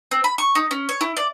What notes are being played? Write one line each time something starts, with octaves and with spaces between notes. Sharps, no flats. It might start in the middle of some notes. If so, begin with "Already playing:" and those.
C4
B5
C#6
D#4
C#4
C#5
E4
D5